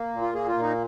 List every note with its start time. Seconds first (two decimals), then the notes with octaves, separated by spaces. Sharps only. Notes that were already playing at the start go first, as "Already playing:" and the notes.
Already playing: A#3
0.13 A#2
0.21 F4
0.35 A#3 G#4
0.48 F4
0.56 A#2
0.62 D#4